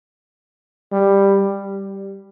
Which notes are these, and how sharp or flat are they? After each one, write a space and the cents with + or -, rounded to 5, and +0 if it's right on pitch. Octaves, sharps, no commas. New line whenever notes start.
G3 +10
G3 -5